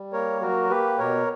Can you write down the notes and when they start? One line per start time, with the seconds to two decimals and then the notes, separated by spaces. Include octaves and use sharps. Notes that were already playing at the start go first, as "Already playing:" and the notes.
Already playing: G3
0.13 A#3 A#4 C#5
0.41 F#3 F#4 A#4
0.70 A#3 G4 B4
0.99 B2 A#4 C#5